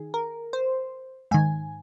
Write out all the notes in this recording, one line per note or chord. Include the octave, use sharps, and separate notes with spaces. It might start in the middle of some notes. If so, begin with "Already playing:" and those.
Already playing: D#3 G#4
A#4
C5
G#2 D#3 G#5